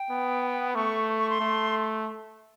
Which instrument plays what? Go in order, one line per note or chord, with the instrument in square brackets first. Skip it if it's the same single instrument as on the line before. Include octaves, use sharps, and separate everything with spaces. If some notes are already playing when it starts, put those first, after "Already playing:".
Already playing: [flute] G5
[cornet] B3
[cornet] A3 [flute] C#6
[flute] C#6
C6
[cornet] A3